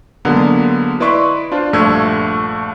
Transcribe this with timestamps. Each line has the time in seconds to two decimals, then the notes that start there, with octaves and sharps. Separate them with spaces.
0.25 D3 F#3 G#3 A#3 B3
1.00 E4 B4 D5 D#5 C6 C#6
1.52 D4 F4 C5
1.73 A#1 G2 A3 F4 E6 G#6